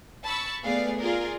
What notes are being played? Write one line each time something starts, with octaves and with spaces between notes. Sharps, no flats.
A5 B5 C#6 E6
A3 B3 G#4 D5 F5
F4 G#4 A#4 D5